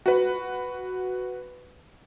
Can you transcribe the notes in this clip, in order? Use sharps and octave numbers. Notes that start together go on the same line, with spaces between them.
F#4 B4